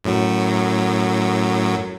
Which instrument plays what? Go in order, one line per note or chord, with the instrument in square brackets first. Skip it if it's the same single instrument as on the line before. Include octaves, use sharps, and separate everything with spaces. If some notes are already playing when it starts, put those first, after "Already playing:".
[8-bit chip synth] F#2 A2 F#3